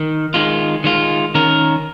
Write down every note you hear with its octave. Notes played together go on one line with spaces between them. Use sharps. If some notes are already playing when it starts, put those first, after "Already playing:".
Already playing: D#3
D#3 G#3 F4
D#3 G#3 F4
D#3 C#4 A#4